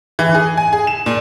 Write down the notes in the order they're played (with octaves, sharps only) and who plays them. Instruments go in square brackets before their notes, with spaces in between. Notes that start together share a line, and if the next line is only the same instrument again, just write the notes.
[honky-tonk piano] E3
G#4
G#5
G#4
E7
A#2